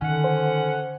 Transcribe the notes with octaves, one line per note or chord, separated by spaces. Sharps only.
D3 D#3 C#4 F#5
C5